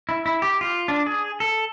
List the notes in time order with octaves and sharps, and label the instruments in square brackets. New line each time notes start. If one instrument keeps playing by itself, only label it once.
[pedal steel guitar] E4
E4
G4
F4
D4
G#4
A4